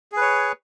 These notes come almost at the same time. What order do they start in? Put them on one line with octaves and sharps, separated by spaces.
G#4 B4 C#5